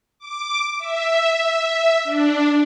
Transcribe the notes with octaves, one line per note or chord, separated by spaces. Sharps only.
D6
E5
D4